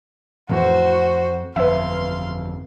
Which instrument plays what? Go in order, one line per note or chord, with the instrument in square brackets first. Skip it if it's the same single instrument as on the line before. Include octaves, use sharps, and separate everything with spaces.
[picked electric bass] F2 [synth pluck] A2 E3 [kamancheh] F#4 C5
[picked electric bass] G1 F2 [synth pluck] B4 E5 [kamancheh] F5 C6